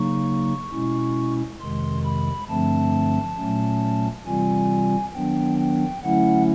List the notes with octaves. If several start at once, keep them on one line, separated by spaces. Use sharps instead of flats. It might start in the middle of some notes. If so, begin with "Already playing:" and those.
Already playing: C#3 F#3 A#3 D#4 C#6
B2 G#3 C#4 E4
F2 C3 D#3 G#3 C6
B5
G2 D3 F3 A3 C4 A5
A#2 F#3 A3 C#4
C3 E3 G3 C4 F4 G#5
D#3 F#3 B3 D4 G5
G5
D3 F#3 A3 C#4 E4 F#5